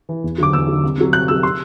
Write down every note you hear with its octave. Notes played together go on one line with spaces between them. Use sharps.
E3
E2
D3 F#3 D6
E2 E6
D3 F#3
C2
C3 F#3
C2 F#6
C3 F#3 E6
C6